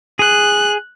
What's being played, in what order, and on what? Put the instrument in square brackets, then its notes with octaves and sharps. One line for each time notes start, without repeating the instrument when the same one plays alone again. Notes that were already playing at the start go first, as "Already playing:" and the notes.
[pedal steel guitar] G#4 [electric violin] F#6